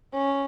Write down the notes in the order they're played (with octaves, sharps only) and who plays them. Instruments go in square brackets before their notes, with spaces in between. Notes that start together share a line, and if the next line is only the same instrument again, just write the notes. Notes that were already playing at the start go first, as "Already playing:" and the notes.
[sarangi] C#4